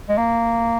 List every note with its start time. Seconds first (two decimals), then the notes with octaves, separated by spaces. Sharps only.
0.09 G#3
0.18 A#3